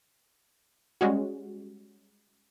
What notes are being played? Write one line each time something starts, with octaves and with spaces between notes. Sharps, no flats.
G3 G#3 C#4 F#4